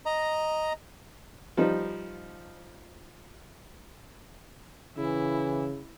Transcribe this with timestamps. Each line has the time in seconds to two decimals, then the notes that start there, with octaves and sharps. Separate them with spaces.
0.06 D#5 A#5
1.57 F3 G3 D#4
4.97 C#3 E3 E4